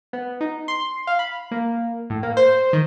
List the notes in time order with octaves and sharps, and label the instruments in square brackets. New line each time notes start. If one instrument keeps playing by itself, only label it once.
[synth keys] B3
D#4
C6
F5
B5
A#3
A2
A#3
C5
D#3